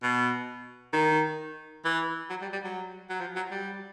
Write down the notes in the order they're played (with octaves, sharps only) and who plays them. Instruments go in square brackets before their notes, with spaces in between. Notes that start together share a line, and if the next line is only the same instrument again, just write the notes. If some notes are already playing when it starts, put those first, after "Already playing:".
[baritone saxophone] B2
D#3
E3
F#3
G3
G3
F#3
F#3
F3
F#3
G3